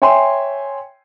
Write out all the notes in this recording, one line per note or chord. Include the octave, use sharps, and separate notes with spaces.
C#5 E5 G5 G#5 C6